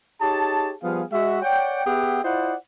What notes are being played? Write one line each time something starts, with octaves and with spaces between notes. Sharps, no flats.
D#4 G4 G#4 C#5 A5
F3 G3 B3 G#4 F5
G#3 F#4 E5
C#5 D5 F#5 G5
B3 G4 G#4 E5 F#5 G5
E4 F4 C5 D5 D#5 F#5